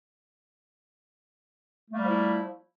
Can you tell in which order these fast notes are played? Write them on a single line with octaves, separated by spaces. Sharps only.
A3 A#3 G3 F3 E4